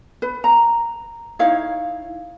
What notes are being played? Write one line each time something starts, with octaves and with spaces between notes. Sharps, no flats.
B4
A#5
D#4 E4 C#5 F5